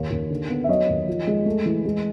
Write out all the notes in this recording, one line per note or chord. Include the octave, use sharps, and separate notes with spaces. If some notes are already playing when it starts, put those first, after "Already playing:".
Already playing: D#2 D#3 C#5
D#2
D3
B3
E5
F#3 C#5 D#5
D#2
F3
G#3
A3
E3
G#3